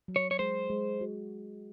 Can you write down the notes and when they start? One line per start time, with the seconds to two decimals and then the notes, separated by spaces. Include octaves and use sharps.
0.08 F#3
0.16 C#5
0.31 C#5
0.39 G#3 C5
0.70 G#3
1.01 F#4